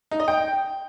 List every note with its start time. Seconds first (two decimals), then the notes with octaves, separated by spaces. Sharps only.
0.11 D#4
0.20 D#5
0.28 G5